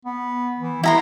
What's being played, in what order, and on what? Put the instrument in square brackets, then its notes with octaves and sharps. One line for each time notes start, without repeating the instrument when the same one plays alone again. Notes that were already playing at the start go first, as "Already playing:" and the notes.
[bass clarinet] B3
E3
[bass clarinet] B3 [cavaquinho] E4 A#5 C6